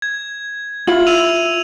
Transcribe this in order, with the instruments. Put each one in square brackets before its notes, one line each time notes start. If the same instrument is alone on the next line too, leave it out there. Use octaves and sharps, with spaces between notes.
[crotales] G#6
[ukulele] E4 F4 [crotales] F#7
[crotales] E6 D#7 F7